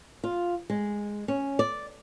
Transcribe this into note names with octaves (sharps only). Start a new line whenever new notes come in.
F4
G#3
C#4
D5